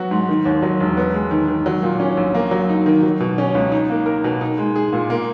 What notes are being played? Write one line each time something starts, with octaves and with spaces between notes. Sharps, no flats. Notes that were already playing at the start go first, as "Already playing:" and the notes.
Already playing: F#3 B3 F#4
G#2
D#3
D#2
F#3
E1
B3
G#3
D#3
D#3
F#3
A#2
C#4
A#1
A#3
F#3
D#4
D#3
F#3
B2
C#4
C#2
D#4
A#3
A#4
B2
D#4
G#3
G#4
A#2
A#3